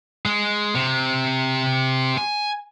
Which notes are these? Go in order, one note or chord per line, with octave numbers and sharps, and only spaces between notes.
G#3
C3
G#5